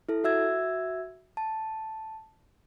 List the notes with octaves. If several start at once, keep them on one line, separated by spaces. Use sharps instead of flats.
E4 A4
F#4 E5 E6 G#6
A5